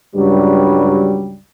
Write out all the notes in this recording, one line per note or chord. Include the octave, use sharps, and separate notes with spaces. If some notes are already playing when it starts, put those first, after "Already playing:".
C#2 G2 F#3 G3